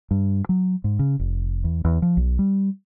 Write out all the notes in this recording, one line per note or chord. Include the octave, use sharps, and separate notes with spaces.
G2
F#3
G#2
C#3
F1
E2
E2
F3
B1
G3